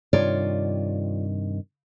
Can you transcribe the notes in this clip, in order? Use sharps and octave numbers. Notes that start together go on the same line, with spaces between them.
G2 C3 D#3 F4 C#5 D5